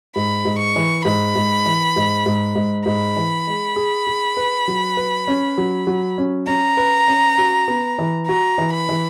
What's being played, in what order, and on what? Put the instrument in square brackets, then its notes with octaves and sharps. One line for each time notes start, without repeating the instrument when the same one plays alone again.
[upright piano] G#2 [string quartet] B5
[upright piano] G#2
[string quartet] C#6
[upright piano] E3
[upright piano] G#2 [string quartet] B5
[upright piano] G#2
E3
G#2
G#2
G#2
[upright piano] G#2 [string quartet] B5
[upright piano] E3
G#3
G#4
G#4
B4
F#3
B4
C#4
F#3
F#3
C#4
[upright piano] C#4 [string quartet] A#5
[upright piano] B4
C#4
F#4
B3
E3
[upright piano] F#4 [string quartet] A#5
[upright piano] E3
[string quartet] B5
[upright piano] E3